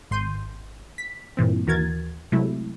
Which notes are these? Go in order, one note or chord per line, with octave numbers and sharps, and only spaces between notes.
G#1 C6 G6 D#7
B6
G2 A#2 E3 C4
D#2 E3 F#4 A#4 G#6 A6
C3 F#3 G#3 A3 E4